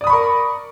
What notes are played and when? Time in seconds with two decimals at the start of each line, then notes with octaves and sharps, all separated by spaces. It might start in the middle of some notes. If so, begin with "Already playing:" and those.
0.01 D5
0.04 D#6
0.07 B5
0.10 C#6
0.13 A#4